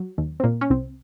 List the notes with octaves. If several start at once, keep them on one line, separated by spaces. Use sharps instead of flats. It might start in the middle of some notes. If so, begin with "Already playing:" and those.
Already playing: F#3
D#2
C4
A#2 A#3
C#4
C2 C4